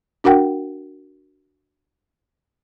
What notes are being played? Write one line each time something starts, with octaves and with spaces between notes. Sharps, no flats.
D4 F#4 A#4 F#5 G5